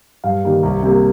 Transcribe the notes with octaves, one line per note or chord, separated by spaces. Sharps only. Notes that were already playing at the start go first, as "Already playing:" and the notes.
G2 F5
D#3 G3 A#3
C2
C3 G3 A#3